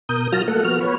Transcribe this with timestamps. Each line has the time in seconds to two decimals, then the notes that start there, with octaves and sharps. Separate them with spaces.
0.09 B2 A#4 D#6 G6
0.32 F#3 F4 F#4 A5 F6 A#6
0.48 A3 A#3 A4 F#5
0.65 F3 B3 F#4 F6
0.80 B3 B4 C#5